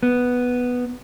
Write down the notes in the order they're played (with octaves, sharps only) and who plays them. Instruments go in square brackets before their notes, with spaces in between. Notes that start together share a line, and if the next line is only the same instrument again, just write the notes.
[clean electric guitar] B3